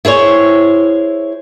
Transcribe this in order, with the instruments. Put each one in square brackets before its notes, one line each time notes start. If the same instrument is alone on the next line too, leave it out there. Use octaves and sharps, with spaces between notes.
[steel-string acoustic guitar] E4 G#4 C5 C#5